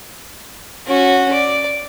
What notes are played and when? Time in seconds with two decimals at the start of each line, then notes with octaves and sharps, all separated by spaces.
0.87 C#4 F#4
1.32 D5